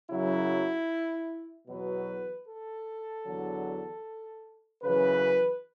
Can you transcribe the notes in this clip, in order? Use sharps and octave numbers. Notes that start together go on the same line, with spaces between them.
F#2 C#3 F#3 E4
E2 B2 F#3 B4
A4
E2 D3 F#3
F#2 C#3 E3 B4